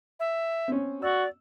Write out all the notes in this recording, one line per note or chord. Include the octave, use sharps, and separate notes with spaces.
E5
C4 C#4
F#4 D5 E6